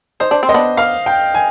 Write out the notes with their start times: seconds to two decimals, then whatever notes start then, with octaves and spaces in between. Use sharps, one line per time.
0.20 D#4 C5
0.31 D4
0.43 C4
0.49 D#5
0.54 B3 D4
0.77 F5
1.06 G5
1.34 G#5